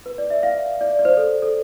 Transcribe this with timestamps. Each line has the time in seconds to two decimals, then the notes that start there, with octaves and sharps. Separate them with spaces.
0.06 B4
0.18 D5
0.30 E5
0.43 F5
0.81 D5
0.99 D5
1.05 C5
1.17 A4
1.42 A4